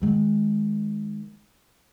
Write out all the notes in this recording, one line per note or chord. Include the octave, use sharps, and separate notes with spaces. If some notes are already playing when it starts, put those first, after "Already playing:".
D#3 G#3